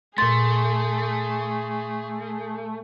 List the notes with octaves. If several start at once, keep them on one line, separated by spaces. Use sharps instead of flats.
A#2 A3 G#4 C6 A6